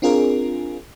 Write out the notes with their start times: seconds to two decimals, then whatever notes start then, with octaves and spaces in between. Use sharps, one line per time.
0.02 C4 D4 F4 G#4 A#4